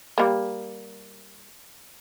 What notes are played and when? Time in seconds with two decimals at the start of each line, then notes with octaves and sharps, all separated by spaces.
0.18 G3 A#3